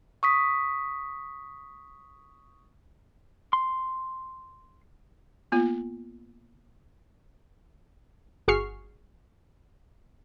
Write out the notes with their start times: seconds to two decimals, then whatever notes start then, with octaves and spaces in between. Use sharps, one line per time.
0.23 C#6 D#6 B6
3.53 C6
5.52 A#3 B3 F4
8.48 G1 F#4 G#4 C#6 F6 C7